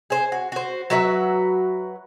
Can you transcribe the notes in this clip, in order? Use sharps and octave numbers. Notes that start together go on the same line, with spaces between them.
G#4 C5
F#4
F#4 C5
F#3 F#4 B4 E5